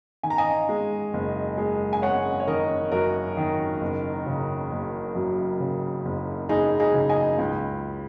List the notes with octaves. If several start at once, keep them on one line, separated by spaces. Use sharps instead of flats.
D#3 G#5
A#5
D#5 G#5
G#3
F#1
G#3
G#5
G#3 C#5 F#5
C#5
D#3 A#4 D#5
F#2 F#4 A#4
D#3
F#1
C#3
F#1
F#2
C#3
F#1
F#1 D#4 G#4
D#4 G#4
C#3
D#5 G#5
C#2